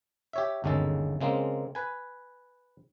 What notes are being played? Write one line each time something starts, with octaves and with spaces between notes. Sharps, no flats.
G4 C#5 E5
G1 D#2 C#3 G#3 A4
C#3 G#3 A#3 C4
B4 G#5